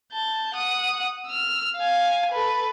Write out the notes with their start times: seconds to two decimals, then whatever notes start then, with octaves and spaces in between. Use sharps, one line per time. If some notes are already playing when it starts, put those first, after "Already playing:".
0.13 A5 G6
0.54 F#5 D#6
1.27 E6 F6
1.77 F5 G#5
2.31 A4 B4